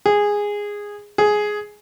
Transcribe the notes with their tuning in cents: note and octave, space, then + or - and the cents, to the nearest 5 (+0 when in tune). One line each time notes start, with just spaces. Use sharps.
G#4 -10
G#4 +10